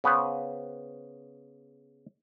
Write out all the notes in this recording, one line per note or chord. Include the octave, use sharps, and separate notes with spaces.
C#3 B3 B4 C5